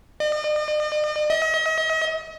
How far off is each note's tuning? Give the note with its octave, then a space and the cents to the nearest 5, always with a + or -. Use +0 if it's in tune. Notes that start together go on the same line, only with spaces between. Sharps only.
D#5 -45
D#5 +40